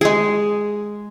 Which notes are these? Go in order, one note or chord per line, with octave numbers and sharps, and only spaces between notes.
G#3 G#4